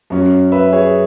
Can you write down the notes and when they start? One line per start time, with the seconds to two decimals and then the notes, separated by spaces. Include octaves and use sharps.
0.10 F#2 F#3 C#4
0.52 B4 E5
0.73 G#4 C#5